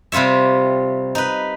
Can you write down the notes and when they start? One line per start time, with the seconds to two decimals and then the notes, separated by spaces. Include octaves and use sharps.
0.12 C3 G3 F4 C#5 E5
1.15 D#4 B4